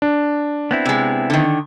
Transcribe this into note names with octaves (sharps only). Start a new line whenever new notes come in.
D4
B3 C4 E4
C3 G#3
D3 D#3